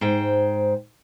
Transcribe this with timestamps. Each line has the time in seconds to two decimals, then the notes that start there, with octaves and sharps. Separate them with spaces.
0.01 G#2 C5 G5